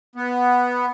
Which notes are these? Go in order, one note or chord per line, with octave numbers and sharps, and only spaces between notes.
B3